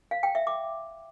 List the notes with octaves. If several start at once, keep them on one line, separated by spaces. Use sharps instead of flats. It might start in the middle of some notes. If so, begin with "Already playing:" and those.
F5
G5
E5
D6